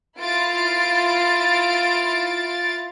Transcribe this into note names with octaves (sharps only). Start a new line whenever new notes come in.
E4 F4 A6 C7 D7